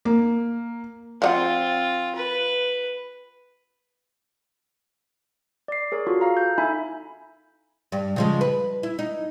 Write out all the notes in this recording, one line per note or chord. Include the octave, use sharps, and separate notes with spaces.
A#3
F3 C4 F4 D#5 F#5
B4
D5 C7
G#4 A#4 C#5
F4 F#4 A4
A4 F5 A#5
G6
D#4 E4 E5 G#5 B5
G2
C#3 F3 G#3
B4
E4
D#4